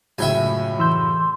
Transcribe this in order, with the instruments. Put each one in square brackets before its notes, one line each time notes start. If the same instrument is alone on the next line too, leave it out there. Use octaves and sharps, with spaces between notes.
[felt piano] C#2 F#2 A2 [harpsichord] E5 G5 G#5
[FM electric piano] E3 E6 G6 [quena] C6